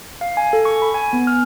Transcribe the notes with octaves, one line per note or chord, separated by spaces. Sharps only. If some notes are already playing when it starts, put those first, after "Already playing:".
F5
G#5
A4
C#6
B5
G#5
B3
F6